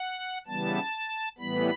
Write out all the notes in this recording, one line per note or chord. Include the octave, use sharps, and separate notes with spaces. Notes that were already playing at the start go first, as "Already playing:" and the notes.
Already playing: F#5
C#3 E3 G3 B3 A5
A2 E3 G3 B3 B5